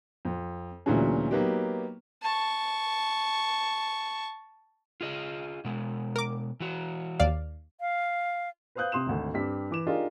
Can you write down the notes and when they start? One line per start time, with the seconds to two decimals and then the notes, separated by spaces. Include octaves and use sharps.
0.25 F2
0.86 D2 A#2 E3 F#3 G#3 C#4
1.31 F#3 A#3 B3 D#4 G4
2.23 A5 C#6
5.01 F4 G#4 D#5
5.65 B2 G#3
6.16 A#4 D6
6.60 E3 F#4
7.20 D#2 D5 F5
7.80 F5
8.75 B4 C5 F5 D#6 F#6 G6
8.92 C3 C6 D#6 E7
9.07 G#1 D2
9.34 G2 C4 G4 B6
9.71 E3 D6 E7
9.87 D4 D#4 F4 G4 G#4 A#4